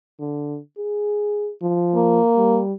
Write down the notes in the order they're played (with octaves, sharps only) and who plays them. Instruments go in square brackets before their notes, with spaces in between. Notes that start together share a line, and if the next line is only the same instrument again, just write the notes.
[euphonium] D3
G#4
F3
[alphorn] A#3
[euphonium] G3